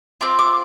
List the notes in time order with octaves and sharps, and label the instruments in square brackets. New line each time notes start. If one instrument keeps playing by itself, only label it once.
[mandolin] C4 F4 D6
D6